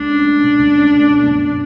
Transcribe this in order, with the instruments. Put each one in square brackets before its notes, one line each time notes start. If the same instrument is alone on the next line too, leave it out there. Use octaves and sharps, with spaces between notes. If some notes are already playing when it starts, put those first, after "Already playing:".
Already playing: [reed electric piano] C#2 G#3 [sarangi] D4
[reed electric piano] C#4
A3
B2
C#2
C#4
A3
B2
F#2